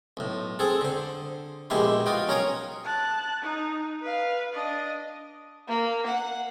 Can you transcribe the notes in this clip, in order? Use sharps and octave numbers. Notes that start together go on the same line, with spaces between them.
B1 A2
C4 G#4 A4
D3 C5
A#1 B2 G#3 E4 G4 C6
F4 F#4 D#5 G5
B1 C#4 A#4 C#5 F5 D#6
A5 F#6
D#4
B4 F5
D4 D#5
A#3
F#5